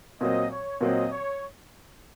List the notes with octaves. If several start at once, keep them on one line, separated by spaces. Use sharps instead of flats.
A#2 F#3 C4 D#5
C#5
A#2 F#3 C4 D#5
C#5